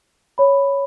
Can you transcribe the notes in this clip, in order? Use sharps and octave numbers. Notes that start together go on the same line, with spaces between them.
C#5 B5